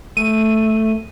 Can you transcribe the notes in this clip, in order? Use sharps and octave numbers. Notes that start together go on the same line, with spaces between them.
A3 D#7